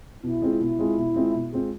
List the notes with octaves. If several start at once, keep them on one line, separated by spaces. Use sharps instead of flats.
B2 E4
G#3 C4 F4 G#4
B2
G#3 C4 F4 G#4
B2
G#3 C4 F4 G#4
B2
G#3 C4 F4 G#4